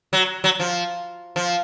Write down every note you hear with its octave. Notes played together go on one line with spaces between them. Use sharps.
F#3
F#3
F3
F3